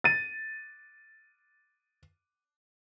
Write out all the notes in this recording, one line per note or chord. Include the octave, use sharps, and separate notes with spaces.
A6 D#7